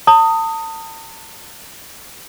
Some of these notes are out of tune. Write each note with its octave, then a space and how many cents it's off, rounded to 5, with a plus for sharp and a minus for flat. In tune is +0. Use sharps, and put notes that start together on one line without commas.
A5 +40 D#6 +0